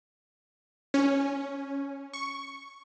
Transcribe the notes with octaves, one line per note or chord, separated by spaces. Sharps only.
C#4
C#6